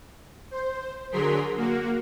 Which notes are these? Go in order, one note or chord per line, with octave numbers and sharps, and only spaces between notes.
C5
D3 F#3 G#4 A#4 C6 B6
A#3 F#4